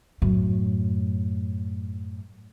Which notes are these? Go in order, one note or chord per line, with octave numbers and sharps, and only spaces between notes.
F#2 A2